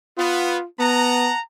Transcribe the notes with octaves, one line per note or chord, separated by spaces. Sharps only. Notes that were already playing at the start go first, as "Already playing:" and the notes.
B3 F4
B3 F#5 A5 A#5